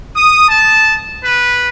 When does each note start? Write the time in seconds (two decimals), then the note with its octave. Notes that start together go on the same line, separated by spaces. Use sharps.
0.15 D#6
0.49 A5
1.23 B4